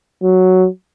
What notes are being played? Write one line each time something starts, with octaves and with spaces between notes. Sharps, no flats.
F#3